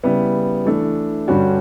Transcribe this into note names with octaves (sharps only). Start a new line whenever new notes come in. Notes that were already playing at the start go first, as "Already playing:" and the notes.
C#3 G3 B3 E4
E3 A3 D4
G2 D3 G3 C#4 F#4